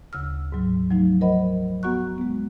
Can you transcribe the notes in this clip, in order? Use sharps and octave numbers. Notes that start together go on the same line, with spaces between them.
D2 C#3 E6 F6
G#2 F#3
F3 F#3 A3 D#4
A#4 C5 D#5 F#5 B5
B3 F#4 F#5 A#5 C#6 F#6
G#3 B3